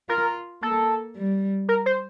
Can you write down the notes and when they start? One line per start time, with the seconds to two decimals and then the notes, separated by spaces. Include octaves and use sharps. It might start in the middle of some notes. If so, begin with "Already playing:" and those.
0.09 F4 A#4
0.62 A#3 A4
1.16 G3
1.69 A#4
1.86 C5